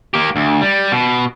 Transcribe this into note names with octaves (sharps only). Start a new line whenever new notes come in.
A#3 G4
D2
G3
B2